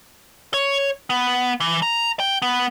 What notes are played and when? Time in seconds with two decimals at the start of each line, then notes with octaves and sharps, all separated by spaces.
0.54 C#5
1.10 B3
1.60 E3
1.82 A#5
2.20 G5
2.42 B3